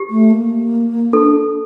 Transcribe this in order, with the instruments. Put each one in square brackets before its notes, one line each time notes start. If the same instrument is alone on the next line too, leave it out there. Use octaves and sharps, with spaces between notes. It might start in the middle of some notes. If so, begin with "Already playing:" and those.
Already playing: [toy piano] G4
[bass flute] A3
A#3
[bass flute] D4 [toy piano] A4